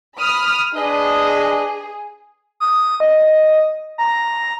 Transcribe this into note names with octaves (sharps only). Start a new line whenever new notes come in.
B5 D#6 F6
D4 G#4 B4 D#5
D#6
D#5
A#5